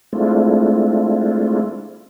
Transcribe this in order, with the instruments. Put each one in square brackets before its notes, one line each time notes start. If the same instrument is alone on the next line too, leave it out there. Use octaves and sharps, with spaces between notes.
[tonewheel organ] G#3 A3 C4 D4 E4 F4